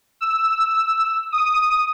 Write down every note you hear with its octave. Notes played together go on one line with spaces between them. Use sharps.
E6
D#6